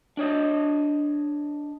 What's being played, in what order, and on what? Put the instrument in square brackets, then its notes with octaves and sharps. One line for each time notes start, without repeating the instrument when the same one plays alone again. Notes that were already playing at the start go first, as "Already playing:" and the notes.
[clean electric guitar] D4 C#5 D#5